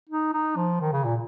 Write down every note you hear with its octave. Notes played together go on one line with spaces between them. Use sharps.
D#4
D#4
F3
D#3
C#3
A#2